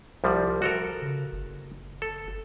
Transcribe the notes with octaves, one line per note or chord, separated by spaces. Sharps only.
C2 F3 G3
F#4 A4 A#4
C#3
F#1
A4